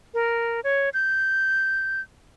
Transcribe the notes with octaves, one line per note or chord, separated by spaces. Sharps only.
A#4
C#5
G6